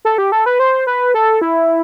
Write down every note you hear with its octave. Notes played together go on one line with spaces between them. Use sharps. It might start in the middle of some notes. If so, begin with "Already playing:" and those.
A4
G4
A4
B4
C5
B4
A4
E4